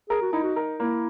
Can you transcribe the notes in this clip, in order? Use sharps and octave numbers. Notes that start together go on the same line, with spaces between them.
G#4 A#4
F#4
D#4 E4
F#4
A#4
A#3 E4